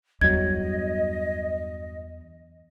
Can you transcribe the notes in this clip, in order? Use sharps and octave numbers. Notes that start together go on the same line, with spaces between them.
E2 G2 F#3 D#5 G#6